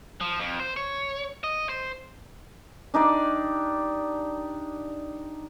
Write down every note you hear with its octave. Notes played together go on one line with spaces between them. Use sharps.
F3
F2
C5
C#5
D#5
C5
D4 D#4 G4 D5